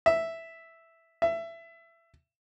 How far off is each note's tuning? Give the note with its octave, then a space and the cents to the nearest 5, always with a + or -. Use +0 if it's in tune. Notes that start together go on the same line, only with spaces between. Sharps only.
E5 +0
E5 +20